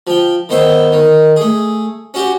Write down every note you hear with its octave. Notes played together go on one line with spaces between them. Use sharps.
F3 G5
D#3 B3 C5 E5
D#3
A3 G#4
C#4 F#4 G4